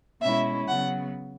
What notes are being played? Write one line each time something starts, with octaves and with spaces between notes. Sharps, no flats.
B2 G#3 C#4 E4 E5
C#3 F#3 B3 F#5